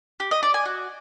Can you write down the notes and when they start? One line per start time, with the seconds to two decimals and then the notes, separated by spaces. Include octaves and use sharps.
0.20 G4
0.31 D#5
0.43 D5
0.54 G#5
0.65 F#4